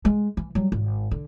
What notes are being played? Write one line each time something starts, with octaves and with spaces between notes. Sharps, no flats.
G#3
E3
F#3 G3
G#1
D3